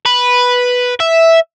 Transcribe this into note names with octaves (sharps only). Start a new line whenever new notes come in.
B4
E5